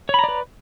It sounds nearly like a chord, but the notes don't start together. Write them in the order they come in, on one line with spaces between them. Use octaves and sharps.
C#5 B5 A#5 D5 B4